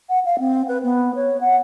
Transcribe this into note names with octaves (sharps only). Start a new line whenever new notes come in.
F#5
F5
C4
B4
B3
C#5
F#5